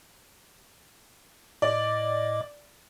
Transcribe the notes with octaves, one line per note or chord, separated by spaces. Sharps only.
A2 D5 D#5 D6